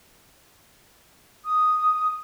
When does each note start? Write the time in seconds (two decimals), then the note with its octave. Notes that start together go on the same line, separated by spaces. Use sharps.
1.44 D#6